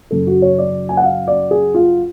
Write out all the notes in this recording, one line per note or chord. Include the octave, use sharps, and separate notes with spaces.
F#1 F#2 C#3 A4
F#4
C#5
D5
G#5
F#5
F5
D5
G#4
F4